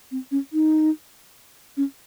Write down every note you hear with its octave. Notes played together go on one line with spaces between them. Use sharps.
C4
C#4
D#4
C#4